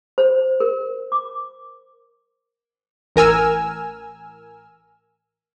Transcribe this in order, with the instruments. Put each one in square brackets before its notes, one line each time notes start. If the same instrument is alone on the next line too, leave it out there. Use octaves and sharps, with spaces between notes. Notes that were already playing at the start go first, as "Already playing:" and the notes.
[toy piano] C5
A#4
D6
[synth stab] A1 A#4 G#5 E6 F6